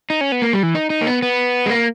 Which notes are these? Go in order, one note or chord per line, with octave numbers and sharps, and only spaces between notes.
D#4
C#4
B3
A#3
G3
E3
D#4
D#4
A#3
B3
B3
G#3
A#3